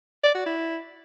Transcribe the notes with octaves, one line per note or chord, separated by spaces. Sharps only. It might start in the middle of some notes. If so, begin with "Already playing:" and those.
D5
F#4
E4